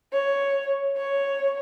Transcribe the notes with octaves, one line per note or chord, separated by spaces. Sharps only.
C#5
C#5